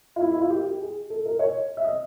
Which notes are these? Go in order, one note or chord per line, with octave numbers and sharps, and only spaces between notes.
F4
E4
E4
F4
G4
G4
G#4
A4
A#4
C#5
E5
D#5